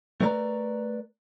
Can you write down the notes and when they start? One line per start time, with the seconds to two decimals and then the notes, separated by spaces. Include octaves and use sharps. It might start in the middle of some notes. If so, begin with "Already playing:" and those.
0.21 A3 A#4 B4 D5 A#5